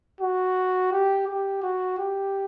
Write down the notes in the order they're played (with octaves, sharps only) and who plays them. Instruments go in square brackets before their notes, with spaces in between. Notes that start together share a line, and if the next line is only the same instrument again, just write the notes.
[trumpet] F#4
G4
G4
F#4
G4